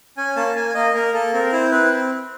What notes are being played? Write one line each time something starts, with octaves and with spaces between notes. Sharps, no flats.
C#4 G#5
A#3 A5
A#3 G#5
A#3 D#5
A#3 A#4
A#3 A4
C4 A#4
E4 C5
C4 B4